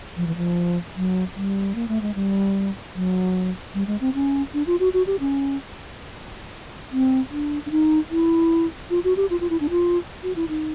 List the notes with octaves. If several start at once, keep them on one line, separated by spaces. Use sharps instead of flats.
F3
E3
F3
F#3
G3
A#3
A3
G#3
G3
F#3
G3
G#3
C4
C#4
D4
F4
F#4
F#4
G4
C#4
C4
D4
D4
D#4
E4
F4
F#4
G4
F4
F4
E4
D4
F4
F#4
E4
D#4